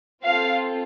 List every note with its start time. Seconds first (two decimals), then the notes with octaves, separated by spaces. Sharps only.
0.23 C4 F4 A4 F5